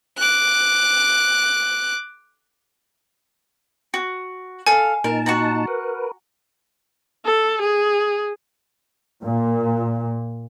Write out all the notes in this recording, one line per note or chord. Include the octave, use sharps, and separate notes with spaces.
D6 F#6
F#4
A4 F5 G#5
A#2 D#4 A#4 A5
F#4 F#5 A#5
A#4 B4
A4
G#4
A#2